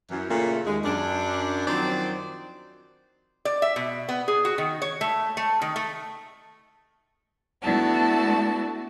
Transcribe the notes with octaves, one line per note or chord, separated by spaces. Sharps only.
F#2 E3
A#2 C#3 A3
D#2 G#3
F#2 D4
D#3 F3 F#3 C4 C5 D5
D5
E5
B2
B3
G#4
F#4
D#3
C#5
A3
A3
D#3
A3
A3 B3 D4 E4 F#4 A5